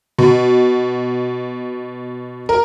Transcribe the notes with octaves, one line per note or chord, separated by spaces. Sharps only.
B2
A#4